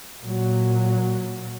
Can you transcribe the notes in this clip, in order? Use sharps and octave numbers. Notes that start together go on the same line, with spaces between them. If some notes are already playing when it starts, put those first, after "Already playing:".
A#2 F#3